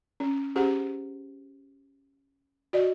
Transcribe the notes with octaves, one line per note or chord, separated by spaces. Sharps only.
C#4
C#4 G4 G#4 C5 F#5
F#4 D5 D#5